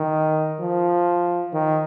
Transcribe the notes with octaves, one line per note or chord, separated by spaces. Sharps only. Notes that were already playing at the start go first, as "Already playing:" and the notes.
Already playing: D#3
F3
D#3